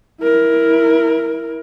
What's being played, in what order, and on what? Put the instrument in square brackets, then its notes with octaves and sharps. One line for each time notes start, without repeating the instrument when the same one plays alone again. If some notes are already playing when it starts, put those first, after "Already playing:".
[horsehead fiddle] E4 A#4